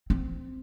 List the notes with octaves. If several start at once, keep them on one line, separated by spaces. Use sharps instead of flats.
C4